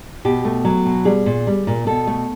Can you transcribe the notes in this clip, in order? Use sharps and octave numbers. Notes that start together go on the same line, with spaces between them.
B2 G4
A3
F#3
B2
G3 G#4
A#2
G3
A#2
B2 A4
A3